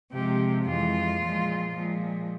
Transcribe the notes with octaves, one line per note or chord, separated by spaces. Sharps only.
C3 F3 G#3 G4
F2 E3 G#3 F4
A#2 F3 G#3
A#2 F3 G#3